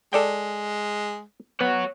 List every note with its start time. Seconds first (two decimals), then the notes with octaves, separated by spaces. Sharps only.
0.13 G#3 A4 D5 G5
1.61 B3 C#5 F#5